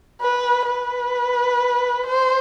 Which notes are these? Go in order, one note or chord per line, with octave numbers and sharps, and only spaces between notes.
B4
B4
C5